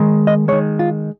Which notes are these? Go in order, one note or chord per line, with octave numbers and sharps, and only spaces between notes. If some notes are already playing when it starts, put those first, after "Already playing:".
Already playing: D#3 G#3
D#5
D#3 G#3 C#5
F4